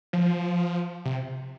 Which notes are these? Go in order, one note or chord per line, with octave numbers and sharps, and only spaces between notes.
F3
C3